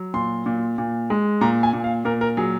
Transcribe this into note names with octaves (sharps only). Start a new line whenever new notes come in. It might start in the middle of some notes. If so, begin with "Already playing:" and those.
Already playing: F#3
A#2 C6
A#2
A#2
G#3
A#2 A#5
G#5
A#2
F5
A#2 A#4
A#4
F#3 G#4